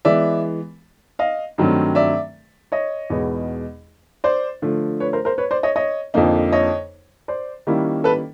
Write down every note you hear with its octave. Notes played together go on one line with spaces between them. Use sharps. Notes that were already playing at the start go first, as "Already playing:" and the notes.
E3 G#3 B3 D5 E5
D#5 F5
G2 D#3 F#3 A3 C4
D5 E5
C#5 D#5
E2 B2 G#3 B3 D#4
C5 D5
D3 F3 A3
B4 C#5
A#4 C5
A#4 C5
B4 C#5
C5 D5
C#5 D#5
C#5 D#5
F2 D3 F3 A#3 D#4
C#5 D#5
C5 D5
D#3 G3 A#3 C#4 E4
A4 B4